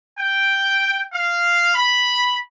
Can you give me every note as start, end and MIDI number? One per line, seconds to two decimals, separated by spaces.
0.19 1.03 79
1.13 1.74 77
1.75 2.36 83